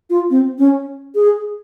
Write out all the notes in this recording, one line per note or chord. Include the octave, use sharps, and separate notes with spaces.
F4
C4
C#4
G#4